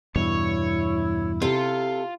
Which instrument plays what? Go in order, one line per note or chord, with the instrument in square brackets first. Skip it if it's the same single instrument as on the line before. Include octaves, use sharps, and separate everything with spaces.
[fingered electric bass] E2 G2 B2 [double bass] E4 [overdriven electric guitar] C#5
[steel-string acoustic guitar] C3 A4 [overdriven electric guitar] F4